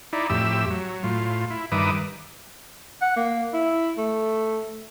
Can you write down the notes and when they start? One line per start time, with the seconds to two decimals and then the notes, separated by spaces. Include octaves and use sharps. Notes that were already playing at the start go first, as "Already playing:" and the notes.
0.13 D#4 E4 D5
0.30 F2 A2 G4 E5 E6
0.70 F#3
1.04 A2 F4
1.50 E4
1.72 G2 D#3 B4 E5 D6 D#6
3.02 F#5
3.16 A#3
3.53 E4
3.98 A3